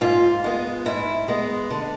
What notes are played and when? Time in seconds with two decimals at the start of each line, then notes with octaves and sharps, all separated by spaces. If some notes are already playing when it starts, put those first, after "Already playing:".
0.01 G#2 F4
0.44 G#3 B3
0.86 G#2 E4
1.28 G#3 B3
1.70 D3